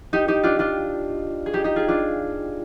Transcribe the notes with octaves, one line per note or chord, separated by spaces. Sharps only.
D#4 G4
D#4 G4
D4 F4
D4 F4
G#4
D#4 G4
D#4 G4
F4 G#4
D4 F4